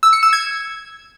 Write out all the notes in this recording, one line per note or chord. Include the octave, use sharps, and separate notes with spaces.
E6
C#7
E6
G#6